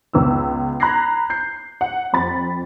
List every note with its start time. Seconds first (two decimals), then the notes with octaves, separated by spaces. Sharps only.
0.13 C#2 B3 E6
0.80 A#5 B5 F#6 G#6 A#6 C7
1.30 G6 C7
1.81 F#5
2.13 F2 B5 A6